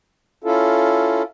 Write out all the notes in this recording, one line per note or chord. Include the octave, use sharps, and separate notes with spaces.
C#4 E4 F4 A4